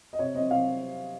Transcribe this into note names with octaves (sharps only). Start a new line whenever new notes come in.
D#5
C3 C#5
C4 D#5
C3 F5